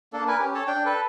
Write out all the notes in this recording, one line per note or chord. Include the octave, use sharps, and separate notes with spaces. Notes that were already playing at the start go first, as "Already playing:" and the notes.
A#3 D4 A4
A#4 B4 G#5
C#4 G4
A4 C#5 A5
D4 G5
A4 B4